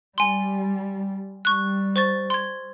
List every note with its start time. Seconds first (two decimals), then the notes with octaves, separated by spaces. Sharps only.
0.18 G3 G#5 C6
1.45 G3 C#6 F#6
1.96 C5 C#6 A6
2.30 C6 G#6